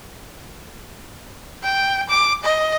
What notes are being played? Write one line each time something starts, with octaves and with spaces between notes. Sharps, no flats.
G5
D6
D#5